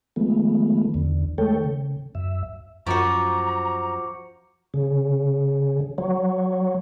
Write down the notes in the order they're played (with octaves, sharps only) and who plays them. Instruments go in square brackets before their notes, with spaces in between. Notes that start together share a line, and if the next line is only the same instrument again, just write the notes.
[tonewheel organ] D#3 F3 G#3 A3 B3
E2 D3
D#3 G#3 A3 A4 C#5 G5
C#3
F#2 E5
[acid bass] F#2 [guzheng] F3 F#4 [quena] A#5 [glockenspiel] C#6 D6 C#7
[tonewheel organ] C#3
F#3